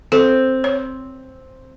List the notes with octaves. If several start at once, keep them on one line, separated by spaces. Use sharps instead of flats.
C4 A4
C#5